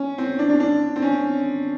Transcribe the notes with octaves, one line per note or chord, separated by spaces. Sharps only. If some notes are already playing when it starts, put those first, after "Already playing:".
Already playing: C#4
C4
D4
D4
D4
C4
C#4